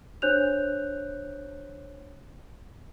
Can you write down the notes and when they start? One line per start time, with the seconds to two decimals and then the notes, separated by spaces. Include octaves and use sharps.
0.22 D4 C5 C#5 F#6 G6 F7